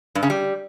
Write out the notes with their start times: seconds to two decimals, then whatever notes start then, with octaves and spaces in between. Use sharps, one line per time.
0.15 G2
0.23 C#3
0.30 G3